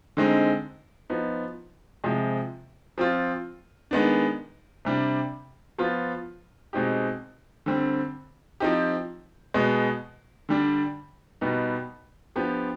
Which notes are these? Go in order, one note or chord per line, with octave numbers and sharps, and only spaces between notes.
D3 G#3 C4 D#4
F3 B3 D#4
C3 F3 G#3
F3 C4 F4
D#3 G#3 B3 D4
C3 G3 D4
F3 B3 F4
B2 G#3 C4 D#4 G4
D3 G3 C4
F3 C4 D#4 G4
B2 G#3 B3
D3 G3 D4
B2 G3 B3 D#4
F3 B3 D4 G4